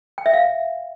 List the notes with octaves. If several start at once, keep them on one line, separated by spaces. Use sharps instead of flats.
G5
E5
F5